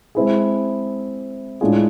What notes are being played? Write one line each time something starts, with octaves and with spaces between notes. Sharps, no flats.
G#3 C4 E4 G#4
A2 G#3 D4 F4 G#4